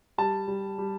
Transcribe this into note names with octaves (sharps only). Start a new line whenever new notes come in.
G3 A5
G3
G3